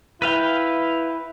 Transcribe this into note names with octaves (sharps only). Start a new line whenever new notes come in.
E4 B4 F5 G5